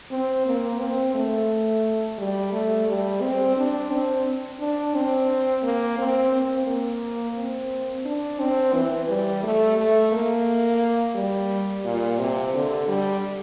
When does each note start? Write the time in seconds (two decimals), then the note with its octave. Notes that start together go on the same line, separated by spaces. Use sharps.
0.11 C4
0.46 A#3
0.81 C4
1.15 A3
2.18 G3
2.53 A3
2.88 G3
3.22 C4
3.57 D4
3.91 C4
4.60 D4
4.95 C4
5.63 A#3
5.98 C4
6.33 C4
6.67 A#3
7.36 C4
8.05 D4
8.40 C4
8.74 E3
9.09 G3
9.43 A3
9.77 A3
10.12 A#3
11.15 G3
11.85 A#2
12.19 C3
12.54 D3
12.88 G3